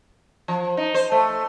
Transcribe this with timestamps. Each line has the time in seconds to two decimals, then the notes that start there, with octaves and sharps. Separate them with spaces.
0.48 F3
0.77 D#4
0.94 C5
1.12 A3